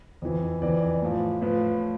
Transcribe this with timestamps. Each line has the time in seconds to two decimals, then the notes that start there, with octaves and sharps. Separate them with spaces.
0.22 F2 E3
0.62 F2 E3 D5
1.02 A2 F3
1.42 A2 F3 B4